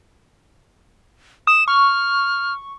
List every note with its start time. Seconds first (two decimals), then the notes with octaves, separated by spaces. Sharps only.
1.47 D#6 E7
1.68 C#6 F6